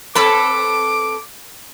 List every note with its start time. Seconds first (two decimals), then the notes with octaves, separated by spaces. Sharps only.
0.15 C4 A4 B4 A5 B5 D6